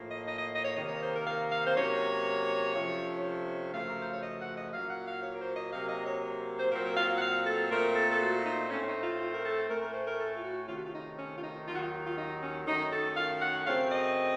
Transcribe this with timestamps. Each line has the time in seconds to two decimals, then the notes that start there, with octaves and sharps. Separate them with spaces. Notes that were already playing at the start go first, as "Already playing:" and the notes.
Already playing: A2 F3 A#3
0.09 D#5
0.27 D#5
0.38 D#5
0.54 D#5
0.64 C#5
0.75 C3 D#3 A#3 D#5
0.88 C#5
1.01 C5
1.14 A#4
1.26 F5
1.51 F5
1.65 C5
1.75 C3 F#3 A#3 C#4 C#5
2.75 C3 F3 A3 C#4
3.73 F#2 C#3 F3 A3 F5
3.90 A#4
4.01 C5
4.12 C#5
4.23 D#5
4.40 F#5
4.56 D#5
4.72 A#2 F#3 A#3 C#4 F5
4.89 F#5
5.07 F5
5.23 C#5
5.34 A#4
5.40 C5
5.56 D#5
5.72 C3 F#3 A#3 F5
5.89 D#5
6.05 C#5
6.59 C5
6.71 A#2 F#3 C4 A#4
6.84 A#4
6.96 F5
7.15 F#5
7.22 F5
7.46 A4
7.70 A#2 A3 C4 A#4
7.95 A4
8.10 A4
8.20 F#4
8.44 D#4
8.70 A2 A3 C4 C#4
8.87 D#4
9.03 F4
9.19 F4
9.33 A#4
9.45 A4
9.69 A2 A3 C#4 A#4
9.82 A#4
9.93 C5
10.06 A#4
10.19 A4
10.36 F4
10.43 F#4
10.68 C3 D#3 A3 C#4 F4
10.76 F#4
10.85 F4
10.93 D#4
11.17 C#4
11.37 F4
11.43 D#4
11.67 D#2 D#3 F#3 F4
11.76 F#4
11.80 F4
12.05 F4
12.17 D#4
12.42 C#4
12.66 F#2 D#3 A3 C#4 D#4
12.92 A4
13.17 F5
13.41 F#5
13.66 F#2 C#3 A3 C4 F5
13.90 D#5